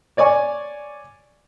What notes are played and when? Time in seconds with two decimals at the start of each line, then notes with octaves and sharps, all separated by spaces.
0.17 C#5 D5 G#5 C#6